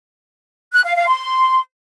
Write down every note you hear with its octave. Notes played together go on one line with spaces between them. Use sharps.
F#6
F5
F5
C6